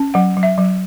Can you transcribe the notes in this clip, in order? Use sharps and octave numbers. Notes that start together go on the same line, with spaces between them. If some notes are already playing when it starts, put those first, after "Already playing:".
Already playing: C#4
F#3 F#5
F#3
E5
F#3